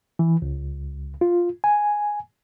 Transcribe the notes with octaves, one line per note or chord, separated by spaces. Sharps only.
E3
C#2
F4
G#5